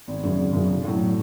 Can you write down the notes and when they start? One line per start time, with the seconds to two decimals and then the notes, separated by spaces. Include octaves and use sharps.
0.08 G#1
0.23 F#2 C#3
0.38 G#1
0.53 F#2 C#3
0.69 B1
0.85 A2 F#3